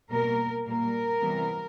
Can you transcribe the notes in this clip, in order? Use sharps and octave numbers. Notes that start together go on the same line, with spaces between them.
B2 G3 A#3 A#4
A#2 G3 A#3 A#4
C3 E3 G3 B3